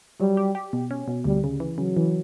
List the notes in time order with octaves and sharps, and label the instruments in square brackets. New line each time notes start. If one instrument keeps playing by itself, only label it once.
[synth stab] F#3 [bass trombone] G3
[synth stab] G4
G4
B2
C#4
B2
[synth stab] D2 [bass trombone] G3
[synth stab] C#3
E3
[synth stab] C#3 [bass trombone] F#3
[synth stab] E3